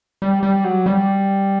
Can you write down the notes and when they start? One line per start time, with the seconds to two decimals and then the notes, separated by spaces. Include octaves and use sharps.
0.22 G3
0.43 G3
0.64 F#3
0.86 G3